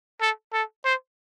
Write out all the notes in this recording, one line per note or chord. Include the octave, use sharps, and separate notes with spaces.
A4
A4
C5